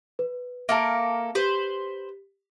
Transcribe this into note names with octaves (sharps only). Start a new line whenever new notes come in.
B4
A#3 A4 A#4 E5 F5 A5
G4 B4 C5